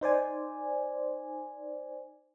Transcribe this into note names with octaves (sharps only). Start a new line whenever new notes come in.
D#4 C5 D5 G#5